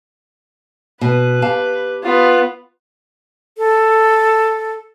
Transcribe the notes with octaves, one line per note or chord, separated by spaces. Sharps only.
B2 B4
G4 F5 A5
B3 F4
A4